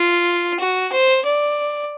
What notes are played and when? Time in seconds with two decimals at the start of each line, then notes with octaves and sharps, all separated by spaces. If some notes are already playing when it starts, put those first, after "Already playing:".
Already playing: F4
0.60 F#4
0.92 C5
1.25 D5